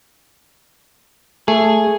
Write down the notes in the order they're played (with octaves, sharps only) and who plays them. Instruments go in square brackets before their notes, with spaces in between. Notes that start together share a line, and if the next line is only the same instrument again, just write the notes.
[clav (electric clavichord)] A3 [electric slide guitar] G#4